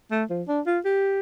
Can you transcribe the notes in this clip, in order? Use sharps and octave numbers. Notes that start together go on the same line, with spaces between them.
A3
F3
D4
F4
G4